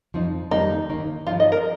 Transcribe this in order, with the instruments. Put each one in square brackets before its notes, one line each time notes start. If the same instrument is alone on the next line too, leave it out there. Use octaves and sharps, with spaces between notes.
[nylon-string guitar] F2 F3 C4 D#4
[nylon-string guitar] F2 D#3 G3 A#3 [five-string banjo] D#4
[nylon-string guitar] D#2 D#3 A#3 D#4
[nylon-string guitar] G2 F3 D#4 [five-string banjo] F4
[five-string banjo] D#5
A#4